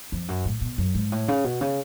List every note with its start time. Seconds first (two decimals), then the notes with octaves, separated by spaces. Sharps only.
0.12 F2
0.28 F#2
0.45 A2
0.61 B2
0.78 F#2
0.94 G#2
1.12 A2
1.28 C#3
1.44 B2
1.61 C#3